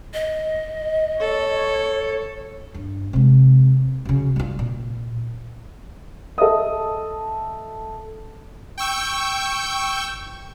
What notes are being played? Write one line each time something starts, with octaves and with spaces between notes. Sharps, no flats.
D#5
A4 C#5
G2
C3 G#3
F#2 C#3
G3 F4
A#2
A4 D#5 E5 D#6
G5 C#6 E6 G6